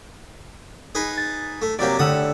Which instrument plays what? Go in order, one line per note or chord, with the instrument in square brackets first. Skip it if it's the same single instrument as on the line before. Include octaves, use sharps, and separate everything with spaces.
[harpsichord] D#4 G#4 B4
[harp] A6
[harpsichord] A3
[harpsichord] C3 F#3 A#3 [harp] G4 D5
[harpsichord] A2 D#6 [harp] D3 F#5 E6